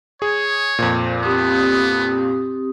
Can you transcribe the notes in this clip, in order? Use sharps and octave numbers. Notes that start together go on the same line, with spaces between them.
G#4 C#5
F2 A#2 C5
B3 C4 G4 D#6